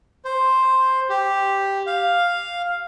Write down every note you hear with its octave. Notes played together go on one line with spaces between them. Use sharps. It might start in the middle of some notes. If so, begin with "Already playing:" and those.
C5
G4
F5